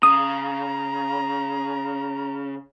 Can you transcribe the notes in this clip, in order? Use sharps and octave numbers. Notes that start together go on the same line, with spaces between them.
C#3 A#5 D#6